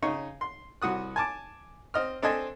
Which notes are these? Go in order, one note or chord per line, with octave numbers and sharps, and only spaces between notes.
C#3 D#4 C#6
C6
C2 F#4 D#6 F#6
G#5 A5 D6
C4 D#5 F6
C4 D4 A4 C5 D#5 G#5